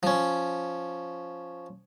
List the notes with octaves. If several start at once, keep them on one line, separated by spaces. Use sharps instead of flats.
F3 C#4